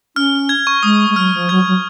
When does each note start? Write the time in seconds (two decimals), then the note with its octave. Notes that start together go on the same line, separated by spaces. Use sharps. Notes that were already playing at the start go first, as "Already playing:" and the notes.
0.16 C#4 F6
0.49 G#6
0.67 C#6
0.83 G#3 D#6
1.09 G#3
1.16 F#3 F6
1.33 F3
1.49 F#3 G#6
1.67 F#3